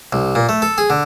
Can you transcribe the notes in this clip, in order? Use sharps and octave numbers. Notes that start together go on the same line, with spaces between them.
C2
A#2
A3
A4
G#4
D3